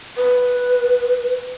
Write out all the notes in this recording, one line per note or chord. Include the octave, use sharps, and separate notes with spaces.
B4